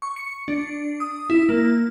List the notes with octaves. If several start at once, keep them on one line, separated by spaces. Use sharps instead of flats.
C#6
C#7
D4
D#6
E4
A#3